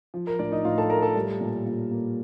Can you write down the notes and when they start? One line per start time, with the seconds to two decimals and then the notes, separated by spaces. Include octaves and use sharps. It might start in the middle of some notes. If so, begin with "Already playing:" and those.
0.14 F3
0.27 A#4
0.39 A2 D4 D5
0.52 D#4 D#5
0.65 A2 F4 F5
0.78 A4 A5
0.90 A3 A#4 A#5
1.02 A4 A5
1.16 G3
1.41 A#2
1.66 A#2
1.91 A#3